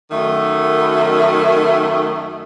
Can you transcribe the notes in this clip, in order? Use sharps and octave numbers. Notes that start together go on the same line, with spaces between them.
F#2 D#3 A3